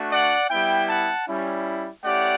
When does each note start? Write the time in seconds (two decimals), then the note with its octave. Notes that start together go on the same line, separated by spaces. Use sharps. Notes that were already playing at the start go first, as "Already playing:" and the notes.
Already playing: A3 D4 F#4
0.12 D5 F#5
0.50 G3 B3 E4 E5 G5
0.89 F#5 A5
1.28 G3 C#4 E4
2.05 A3 C#4 E4 G4 D5 F#5